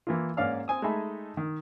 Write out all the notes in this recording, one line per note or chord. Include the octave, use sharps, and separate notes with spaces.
E3 A#3 F4
G#2 A#3 C#4 D5 F5 F6
C4 G#5 D#6
G#3 A3 D#4 E5 G#5 B5
D#3